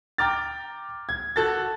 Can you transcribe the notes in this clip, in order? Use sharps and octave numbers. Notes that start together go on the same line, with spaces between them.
G5 A#5 D6 F6 A6
G#6
F#4 A4 A6